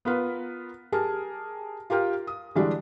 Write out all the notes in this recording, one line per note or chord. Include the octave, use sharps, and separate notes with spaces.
B3 F4 A#4 B4
G4 G#4 A#4 A5
F4 G4 A#4 G5
D#6
D3 E3 G3 G#3 D4 F#4